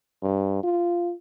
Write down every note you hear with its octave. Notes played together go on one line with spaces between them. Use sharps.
G2
F4